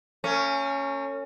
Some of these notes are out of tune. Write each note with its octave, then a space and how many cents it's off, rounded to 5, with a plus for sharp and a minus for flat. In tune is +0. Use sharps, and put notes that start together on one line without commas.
A#3 -45 C#4 +0